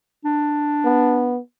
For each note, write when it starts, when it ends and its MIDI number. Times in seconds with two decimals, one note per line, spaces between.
0.24 1.35 62
0.85 1.39 59